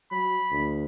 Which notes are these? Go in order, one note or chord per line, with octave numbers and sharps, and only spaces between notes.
F#3 B5
D2